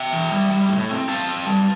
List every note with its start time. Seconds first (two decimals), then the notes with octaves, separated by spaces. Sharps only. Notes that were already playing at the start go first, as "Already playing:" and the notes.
Already playing: E5 G5
0.12 E3
0.32 G3
0.52 G3
0.70 A2
0.90 C4
1.08 C4 F5 A5
1.28 C4
1.47 G3